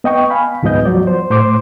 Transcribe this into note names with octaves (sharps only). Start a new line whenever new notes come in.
B3 D#5 G5 C#6
F5 G#5 B5
D2 G#2 F3 B3 D#5 G6
F3 F#3 D5
C5
A2 C5 C6 D6